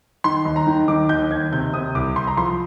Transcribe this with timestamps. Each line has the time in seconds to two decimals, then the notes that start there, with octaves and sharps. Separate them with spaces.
0.24 D#3 C6
0.45 D#2
0.56 A#5
0.67 D#3
0.88 D#3 D6
1.09 D#2 G6
1.31 D#2 G#6
1.52 C3 G6
1.74 C3 D#6
1.95 C2 D6
2.16 C2 C6
2.27 A#5
2.37 F3 C6